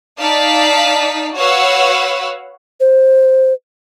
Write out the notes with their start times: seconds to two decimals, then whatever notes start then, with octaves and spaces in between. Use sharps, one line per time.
0.18 D#4 D5 F5 A5 B6
1.35 F#4 B4 C#5 F5 F#5 E6
2.80 C5